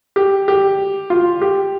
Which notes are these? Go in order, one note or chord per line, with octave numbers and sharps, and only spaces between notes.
G4
G4
F4
G4